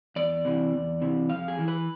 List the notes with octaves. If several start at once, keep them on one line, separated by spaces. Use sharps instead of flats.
E2 D5
C3 E3
E2
C3 E3
F2 F5
G#4
E3
B4